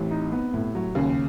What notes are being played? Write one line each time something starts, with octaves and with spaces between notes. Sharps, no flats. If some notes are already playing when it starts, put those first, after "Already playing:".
Already playing: A1 C3
D#4
B3
A2
F#3
D#2 C#3